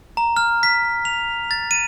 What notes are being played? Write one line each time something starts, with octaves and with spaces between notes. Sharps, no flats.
A#5
F6
B6
F7
A6
D#7